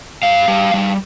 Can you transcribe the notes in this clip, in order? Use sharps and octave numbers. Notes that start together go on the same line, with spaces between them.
G2 F5
G3
G3